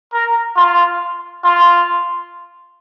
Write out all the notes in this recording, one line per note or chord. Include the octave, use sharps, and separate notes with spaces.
A#4
F4
F4